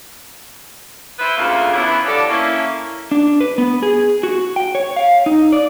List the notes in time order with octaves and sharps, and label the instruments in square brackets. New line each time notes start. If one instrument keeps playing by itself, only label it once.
[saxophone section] E4 B4 C5
D2 C#3 A3 A#3 F4 F5
E3 B3 C#4 D4 E4
F3 D4 F#4 G4 A4 D5
A#3 C#4 E4
[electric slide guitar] D4
B4
B3
G#4
F#4
G5
C#5
F5
D#4
D5